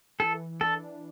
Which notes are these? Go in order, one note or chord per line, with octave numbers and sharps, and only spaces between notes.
E3 A4
D4 A4